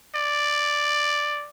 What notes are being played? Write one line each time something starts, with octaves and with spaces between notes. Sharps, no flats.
D5